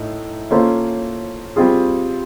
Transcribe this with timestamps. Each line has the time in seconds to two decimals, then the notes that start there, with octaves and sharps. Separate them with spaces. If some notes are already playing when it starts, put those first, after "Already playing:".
Already playing: A2 A3 D#4
0.51 A#3 C#4 F4 A4 C5
1.56 G3 C4 F4 G#4